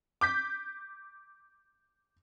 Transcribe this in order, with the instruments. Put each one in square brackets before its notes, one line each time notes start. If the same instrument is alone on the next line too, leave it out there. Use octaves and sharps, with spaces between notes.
[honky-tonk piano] D6 G6 B6